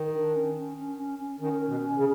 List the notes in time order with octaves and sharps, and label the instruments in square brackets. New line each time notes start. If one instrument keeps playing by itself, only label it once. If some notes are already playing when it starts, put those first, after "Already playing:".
Already playing: [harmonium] D#3
[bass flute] D4
C#4
C#4
C#4
C#4
C#4
[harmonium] D#3 [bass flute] C#4
[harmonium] B2
C#3